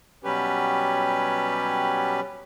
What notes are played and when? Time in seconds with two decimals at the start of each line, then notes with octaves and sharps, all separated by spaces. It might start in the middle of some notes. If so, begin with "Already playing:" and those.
0.24 B2 F#3 G3 C#4 G4 B4